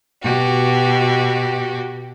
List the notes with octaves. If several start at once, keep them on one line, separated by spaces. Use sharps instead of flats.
B2 F#4 G4